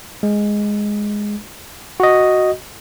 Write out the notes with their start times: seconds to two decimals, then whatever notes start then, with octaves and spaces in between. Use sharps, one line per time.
0.23 G#3
2.00 F#4 D#5